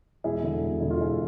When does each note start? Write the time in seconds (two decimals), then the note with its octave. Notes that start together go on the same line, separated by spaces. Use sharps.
0.24 E1 E4 G#4
0.43 D3
0.63 E1
0.80 D3 E4
0.91 F4
1.01 E1 E4 G#4